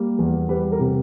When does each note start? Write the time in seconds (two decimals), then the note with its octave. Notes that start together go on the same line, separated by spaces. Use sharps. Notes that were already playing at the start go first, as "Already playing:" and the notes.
Already playing: G3 A#3
0.18 E2
0.49 G3 B4
0.72 A#4
0.79 C3